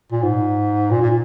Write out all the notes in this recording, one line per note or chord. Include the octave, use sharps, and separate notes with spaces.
A#2
G#2
A#2
A#2